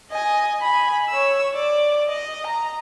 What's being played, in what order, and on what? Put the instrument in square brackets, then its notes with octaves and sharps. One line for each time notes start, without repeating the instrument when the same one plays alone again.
[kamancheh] D#5 G#5
G#5 B5
C#5 E6
D5
D#5
A#5